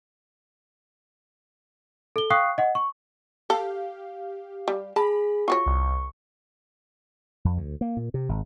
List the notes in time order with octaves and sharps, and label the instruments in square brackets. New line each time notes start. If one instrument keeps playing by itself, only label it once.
[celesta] A4 G7
F5 G5 C#6 D#6 F#6 C7
D#5 F#5
C#6
[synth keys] G4 F5 [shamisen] A4
[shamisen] G3
[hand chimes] G#4 [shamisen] A5 [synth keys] B5
[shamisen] F4 F#4 C#5 [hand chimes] C#6
[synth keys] C2
[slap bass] F2
D2
A#3
A#2
C3
G#1